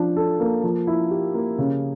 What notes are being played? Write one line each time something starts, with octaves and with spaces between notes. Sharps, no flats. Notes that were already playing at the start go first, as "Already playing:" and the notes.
Already playing: F3 D4
A4
A#3
F3
E4
G4
A#3
C#3